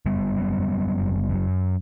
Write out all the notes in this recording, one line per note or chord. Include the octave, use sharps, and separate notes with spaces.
F#1 G3 B3
F#2
F#2
F#1
F#2